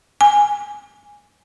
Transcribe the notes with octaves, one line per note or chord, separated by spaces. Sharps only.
G#5